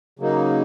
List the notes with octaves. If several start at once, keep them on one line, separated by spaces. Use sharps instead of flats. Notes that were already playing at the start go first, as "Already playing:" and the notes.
C#3 F#3 A#3 D#4